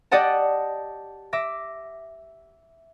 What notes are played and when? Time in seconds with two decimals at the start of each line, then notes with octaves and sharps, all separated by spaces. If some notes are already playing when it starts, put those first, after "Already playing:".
0.11 G4 D5 D#5 F#5 A5
1.33 E5 D6 A#6